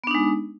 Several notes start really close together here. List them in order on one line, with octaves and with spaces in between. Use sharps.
B3 D4 D#4 G#3